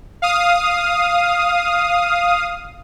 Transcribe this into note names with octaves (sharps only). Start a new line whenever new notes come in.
F5 D#6